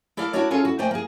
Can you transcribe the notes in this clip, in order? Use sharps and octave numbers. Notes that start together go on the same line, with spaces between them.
E4 A4 A#4 D5 F5
D4 E4 F#4 A#4 C#5 D5
C#4 E4 F4 G#4 A4 C#5
F#4
A3 A#3 C5 D5 G5 G#5
A#3 G#4